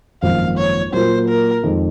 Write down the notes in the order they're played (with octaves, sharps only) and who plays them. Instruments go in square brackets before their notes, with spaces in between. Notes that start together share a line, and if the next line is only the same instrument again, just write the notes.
[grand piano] G#1 F#2 F3 A#3 [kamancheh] F5
[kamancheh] C#5
[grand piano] A#2 F#3 A#3 F4 [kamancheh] C5
[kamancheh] A#4
[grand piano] F2 D#3 G#3